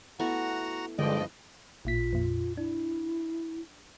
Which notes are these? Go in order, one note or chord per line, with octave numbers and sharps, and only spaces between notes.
A3 B3 E4 F#4 F#5 A#5
G2 D3 F3 G#3 B4 D5 D#5 G5
A1 A#2 F4 B6
F2 A#2
D4 E4